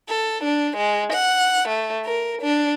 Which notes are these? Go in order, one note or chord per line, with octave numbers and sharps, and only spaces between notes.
A4
D4
G#3
F#5
A3
A#4
D4